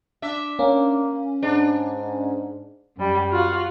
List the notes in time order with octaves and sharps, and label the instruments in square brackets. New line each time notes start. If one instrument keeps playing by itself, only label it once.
[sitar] D4 E5
[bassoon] A#3 [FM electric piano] C#4
[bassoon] G#2 [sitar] D4
[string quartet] F#2 G3
F4 F#4 F5